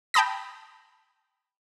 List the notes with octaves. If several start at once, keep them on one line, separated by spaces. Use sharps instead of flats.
G5 A5 B5 D#6 A#6